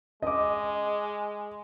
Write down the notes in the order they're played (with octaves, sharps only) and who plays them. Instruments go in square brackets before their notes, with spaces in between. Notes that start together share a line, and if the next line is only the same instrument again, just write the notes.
[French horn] G#3 [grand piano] D#5 D6